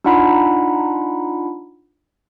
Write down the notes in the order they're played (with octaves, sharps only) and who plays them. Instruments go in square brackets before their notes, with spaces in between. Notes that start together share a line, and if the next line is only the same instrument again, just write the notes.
[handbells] D4 D#4 F4 F#5 A#5 B5